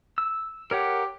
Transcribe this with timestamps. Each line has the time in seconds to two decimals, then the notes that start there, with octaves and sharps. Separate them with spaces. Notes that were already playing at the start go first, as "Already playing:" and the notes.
0.18 E6
0.71 G4 A#4 C#5 F#5